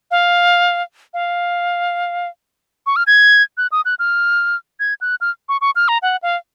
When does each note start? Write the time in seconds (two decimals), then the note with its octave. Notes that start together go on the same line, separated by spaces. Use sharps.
0.11 F5
1.14 F5
2.86 C#6
2.96 F6
3.07 G#6
3.58 F#6
3.72 D#6
3.85 F#6
3.99 F6
4.80 G#6
5.01 F#6
5.21 F6
5.49 C#6
5.61 C#6
5.76 F6
5.88 A#5
6.02 F#5
6.23 F5